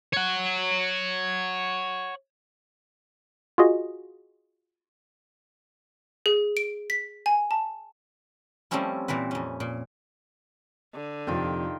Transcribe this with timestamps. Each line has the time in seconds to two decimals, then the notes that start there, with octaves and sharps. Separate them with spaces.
0.13 C#5 F#5
3.58 F4 F#4 G#4 D#5
6.26 G#4
6.57 D7
6.90 B6
7.26 G#5
7.51 A5
8.71 F3 G3 A3 C4 C#4 E4
9.08 A#2 E3 C4 B4
9.31 F2 C#4
9.60 A#2
10.94 D3
11.27 F2 C3 D#3 F3 F4 G5